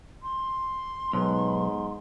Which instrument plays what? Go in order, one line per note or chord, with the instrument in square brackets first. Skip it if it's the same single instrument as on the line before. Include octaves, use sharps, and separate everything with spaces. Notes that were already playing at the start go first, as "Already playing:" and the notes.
[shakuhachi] C6
[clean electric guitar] B1 [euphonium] G#2